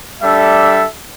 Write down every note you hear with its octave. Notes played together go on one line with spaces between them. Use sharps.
G3 D4 A4 E5